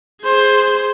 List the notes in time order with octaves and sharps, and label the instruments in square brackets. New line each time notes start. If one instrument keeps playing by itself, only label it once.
[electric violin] G#4 C5